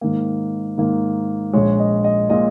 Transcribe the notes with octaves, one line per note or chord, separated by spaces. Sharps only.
G#2 D#3 A#3
G#2 D#3 A#3
A#1 A#2 G#3 C#5
D#5
D#5
A#2 G#3 D#5